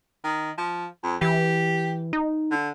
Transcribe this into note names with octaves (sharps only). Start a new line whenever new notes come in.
D#3
F3
F2
E3 G4
D#4
D3